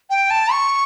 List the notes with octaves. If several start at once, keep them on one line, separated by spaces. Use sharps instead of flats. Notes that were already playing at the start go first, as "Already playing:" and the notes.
G5
A5
C#6